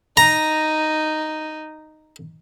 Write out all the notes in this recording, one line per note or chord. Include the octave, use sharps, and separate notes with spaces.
D#4 A#5